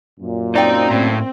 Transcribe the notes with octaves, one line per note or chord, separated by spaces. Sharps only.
F#2 A#2
C4 D#4 D5 F5 G5 A#5
A2